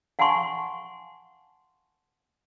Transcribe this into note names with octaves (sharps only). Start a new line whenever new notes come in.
F5 F#5 G#5 A5 C6 C#6